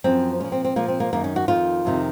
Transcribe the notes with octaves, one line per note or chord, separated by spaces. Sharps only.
F#2 F3 C4
A#2 F3 C#4
C4
C4
A#2 F3 A#3
C4
A#3
F#2 D#3 A#3
C#4
F#4
F2 D#3 F4
F2 C3 D#3